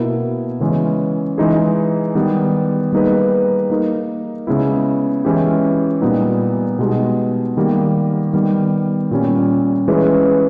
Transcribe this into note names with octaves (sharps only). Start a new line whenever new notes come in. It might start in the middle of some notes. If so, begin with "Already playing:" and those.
Already playing: B2 A#3 E4 A#4
C#3 E3 G#3 C#4
E3 G#3 D#4 G#4
D#3 G3 B3
G3 A#3 D#4 G#4 B4
A#3 D#4 A#4
C#3 G#3 B3 E4
E3 G#3 C#4 E4 G4
A#2 G3 B3 D#4
B2 G#3 D#4 G4
D#3 G3 A#3
D#3 G3 B3
A#2 G3 C#4
E3 G#3 C#4 G#4 B4